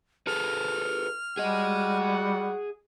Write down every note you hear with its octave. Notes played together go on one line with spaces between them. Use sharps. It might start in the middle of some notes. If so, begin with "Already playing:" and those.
G#4 A4 B4 F6
G3 F#4 G#4 D#5 F#5